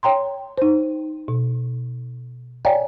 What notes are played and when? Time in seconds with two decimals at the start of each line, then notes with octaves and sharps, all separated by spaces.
0.03 C#5 G5 A#5 C6
0.58 D#4 C5
1.28 B2
2.65 C#5 D5 F5 G5 G#5 A#5